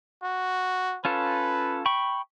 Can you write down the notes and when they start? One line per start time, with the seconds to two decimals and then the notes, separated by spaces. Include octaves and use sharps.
0.23 F#4
1.05 C#4 F4 A4 B4
1.86 G5 B5 C#6